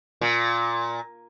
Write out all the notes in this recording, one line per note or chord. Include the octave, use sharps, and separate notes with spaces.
A#2